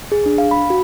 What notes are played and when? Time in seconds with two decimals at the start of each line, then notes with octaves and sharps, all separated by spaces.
0.12 G#4
0.26 D4
0.38 F5
0.51 B5
0.70 F#4